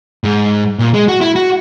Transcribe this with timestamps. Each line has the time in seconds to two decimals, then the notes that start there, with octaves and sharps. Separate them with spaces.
0.24 G#2
0.79 A#2
0.94 G#3
1.08 F#4
1.21 E4
1.36 F#4